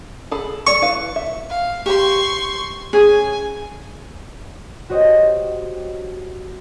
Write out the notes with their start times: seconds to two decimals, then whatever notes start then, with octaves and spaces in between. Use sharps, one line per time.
0.31 G#4 A4 B5
0.67 A4 D5 C#6
0.82 E4 B4 F5
1.16 E5
1.49 F5
1.86 G4 C6 C#6
2.93 C#4 G#4 G#5
4.89 F#4 G4 C5 C#5 D#5 G5